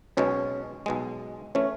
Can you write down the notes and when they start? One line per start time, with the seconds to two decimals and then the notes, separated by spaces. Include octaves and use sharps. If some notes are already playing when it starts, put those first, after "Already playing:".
0.17 B1 B2 G#3 C#4
0.86 B1 B2 G#3
1.55 E3 A3 C#4